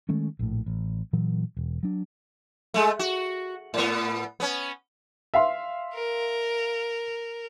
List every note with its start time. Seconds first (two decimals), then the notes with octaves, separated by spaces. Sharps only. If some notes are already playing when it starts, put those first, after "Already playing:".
0.09 D#3 G#3 A3 C#4
0.39 A#1 A2
0.66 A1
1.13 A#2 E3 F#3
1.57 E1
1.83 F#3 D4
2.74 G#3 A3
2.99 F#4
3.74 A2 B3
4.40 B3 C#4
5.34 E5 F5 C6
5.94 A#4